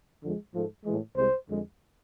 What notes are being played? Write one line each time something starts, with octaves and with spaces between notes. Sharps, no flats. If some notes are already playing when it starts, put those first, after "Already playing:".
F2 D3 F3 G#3
G#2 F3 A3
A2 E3 G#3
C2 C3 G#3 C5
F2 D3 G#3